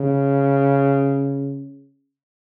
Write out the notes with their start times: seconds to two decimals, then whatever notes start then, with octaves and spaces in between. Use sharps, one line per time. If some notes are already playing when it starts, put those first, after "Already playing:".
Already playing: C#3